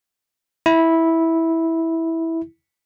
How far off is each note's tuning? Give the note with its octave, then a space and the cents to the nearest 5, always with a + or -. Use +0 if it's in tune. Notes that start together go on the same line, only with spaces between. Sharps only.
E4 -10